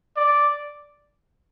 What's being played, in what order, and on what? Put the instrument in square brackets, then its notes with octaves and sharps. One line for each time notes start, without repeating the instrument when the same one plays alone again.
[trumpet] D5